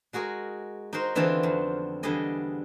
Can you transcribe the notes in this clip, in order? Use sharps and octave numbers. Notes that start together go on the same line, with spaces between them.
G#3 F#4 G#4 A#4
D#4 F#4 A#4 C5
D3 E3 B3 C4 F4 F#4
F2
E2 D3 G3 G#4 D#5 G#5